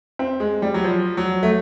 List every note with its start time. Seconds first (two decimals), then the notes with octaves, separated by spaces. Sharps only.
0.19 C4
0.40 G#3
0.62 G3
0.74 F#3
0.84 F3
1.17 F#3
1.43 A3